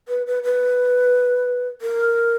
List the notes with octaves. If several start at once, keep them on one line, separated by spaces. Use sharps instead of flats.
B4
B4
B4
A#4